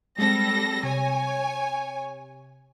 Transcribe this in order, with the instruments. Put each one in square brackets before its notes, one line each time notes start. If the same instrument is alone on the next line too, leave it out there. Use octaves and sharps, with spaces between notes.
[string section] G3 A4 A#6 [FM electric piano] G#3 C4
[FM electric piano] C3 [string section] C#5 G#5